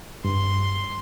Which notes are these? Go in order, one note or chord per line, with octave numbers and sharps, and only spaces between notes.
G2 C6